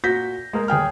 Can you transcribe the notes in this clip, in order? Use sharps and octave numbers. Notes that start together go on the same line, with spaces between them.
A#2 F#4 G6 A#6 B6
G#3 A#3
D#1 G#4 G5 F6